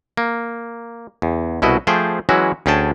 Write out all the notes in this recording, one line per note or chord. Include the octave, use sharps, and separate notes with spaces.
A#3
E2
C2 B2 E4 F#4 D#5
F3 A3 G#4 C5 G5
E3 F#3 G#3 C#4 E4 F#4
D2 C#4 G#4 G5 A5